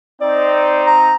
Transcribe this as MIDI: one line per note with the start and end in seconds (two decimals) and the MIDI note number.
0.21 1.13 60
0.21 1.13 63
0.21 0.92 74
0.86 1.15 82